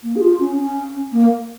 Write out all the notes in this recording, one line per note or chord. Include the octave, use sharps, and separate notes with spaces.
A#3
G#4
F4
C#4
C#4
A#3